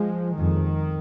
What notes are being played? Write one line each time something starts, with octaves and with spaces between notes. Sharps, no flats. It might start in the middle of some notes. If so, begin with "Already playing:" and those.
Already playing: F3 G#3
F2 D#3